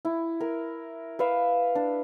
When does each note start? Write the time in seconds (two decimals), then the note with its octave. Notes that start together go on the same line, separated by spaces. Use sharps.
0.05 E4
0.41 A#4
1.19 B4 E5 F5 D6
1.75 D4